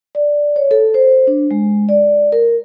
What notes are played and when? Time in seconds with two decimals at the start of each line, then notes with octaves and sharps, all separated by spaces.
0.15 D5
0.56 C#5
0.71 A4
0.94 C5
1.27 D4
1.51 G#3
1.89 D5
2.32 A#4